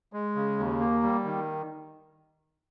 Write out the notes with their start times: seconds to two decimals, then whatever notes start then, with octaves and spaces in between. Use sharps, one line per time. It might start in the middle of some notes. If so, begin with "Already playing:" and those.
0.13 G#3
0.35 C#3
0.58 D#2
0.80 A#3
1.03 G3
1.25 D#3